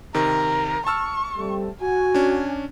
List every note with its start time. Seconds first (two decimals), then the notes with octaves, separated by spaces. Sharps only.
0.14 C3 D#3 A#4
0.87 A5 C#6 E6 F6
1.37 G3 A3 C4
1.81 F#4 G#5
2.14 C#4 D4